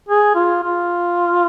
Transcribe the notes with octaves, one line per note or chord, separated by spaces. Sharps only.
G#4
F4
F4